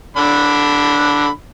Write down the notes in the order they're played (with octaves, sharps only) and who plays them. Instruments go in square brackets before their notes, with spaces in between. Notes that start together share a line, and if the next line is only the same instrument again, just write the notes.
[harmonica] D3 D4 B5